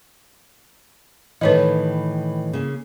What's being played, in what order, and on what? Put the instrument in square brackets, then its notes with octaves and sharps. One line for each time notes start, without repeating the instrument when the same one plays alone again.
[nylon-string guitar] A2 D#3 E3 [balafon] B4 C#5 D#5
[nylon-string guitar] C#3 A#3